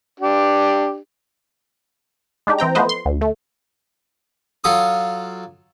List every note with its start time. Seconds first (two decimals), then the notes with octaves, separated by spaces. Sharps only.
0.20 D4 G4
2.47 G#3 D4 D#4 G4
2.59 E3 C4 G5 A#5
2.75 F3 A3 B3 B4 C5 D#5
2.89 C6
3.06 D2
3.21 A3
4.64 F#3 F4 A4 D6 D#6